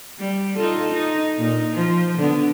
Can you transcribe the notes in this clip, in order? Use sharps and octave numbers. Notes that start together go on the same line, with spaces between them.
G3
D#4 F4 A4
D#4
A#2 D#4
F3
D3 B3